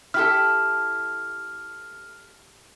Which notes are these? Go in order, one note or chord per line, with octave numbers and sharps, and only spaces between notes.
E4 G4 A4 F6